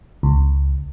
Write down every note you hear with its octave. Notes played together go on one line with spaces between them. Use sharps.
C#2